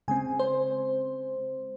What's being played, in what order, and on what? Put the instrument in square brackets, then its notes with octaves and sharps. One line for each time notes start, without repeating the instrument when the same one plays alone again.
[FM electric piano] C#3 G#3 C4 G#5
C5